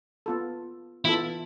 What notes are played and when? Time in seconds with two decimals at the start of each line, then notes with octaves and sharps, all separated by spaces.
0.26 B3 F4 A4
1.05 E3 B3 E4 F4 A4